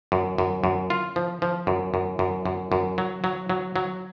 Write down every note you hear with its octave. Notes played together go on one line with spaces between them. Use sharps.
F#2
F#2
F#2
F4
F3
F3
F#2
F#2
F#2
F#2
F#2
F#3
F#3
F#3
F#3